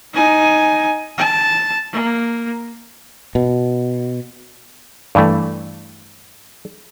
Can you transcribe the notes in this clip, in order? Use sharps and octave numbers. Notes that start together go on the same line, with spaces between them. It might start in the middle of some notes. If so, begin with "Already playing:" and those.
D#4 G#5
A5
A#3
B2
G2 E3 A3